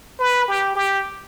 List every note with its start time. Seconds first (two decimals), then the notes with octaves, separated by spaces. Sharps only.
0.20 B4
0.48 G4
0.76 G4